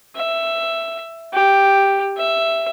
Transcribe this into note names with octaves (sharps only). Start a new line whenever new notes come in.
E5
G4
E5